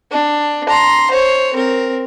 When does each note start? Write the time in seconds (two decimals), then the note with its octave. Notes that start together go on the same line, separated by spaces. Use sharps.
0.11 D4
0.69 A#5 C6
1.11 C5 C#5
1.53 C4 A#4